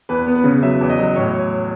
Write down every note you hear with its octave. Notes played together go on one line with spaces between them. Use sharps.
E2 B4
B3
B4
C#3
F#3 E5
E2
D#5
F#3
A2 C#5